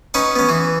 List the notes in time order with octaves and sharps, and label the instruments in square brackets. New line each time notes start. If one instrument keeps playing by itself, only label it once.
[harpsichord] C#4 D#4 B4 F#5
B3 C#4
E3